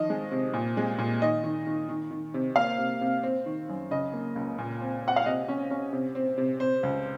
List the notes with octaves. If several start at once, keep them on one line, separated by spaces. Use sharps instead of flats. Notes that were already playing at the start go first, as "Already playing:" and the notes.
Already playing: D#3 F3 D#5
G#3
C3
A#2
G#3
A#2
D#3 D#5
D#3
D#3
D#3
D#3
C3
A#3 F5
C3
C3
C4
D#3
F#2
C#3 D#5
A#3
C#2
A#2
C4
C4 F#5
F5
C3 D#5
C#4
C#4
C3
C4
C3
C3 C5
C#2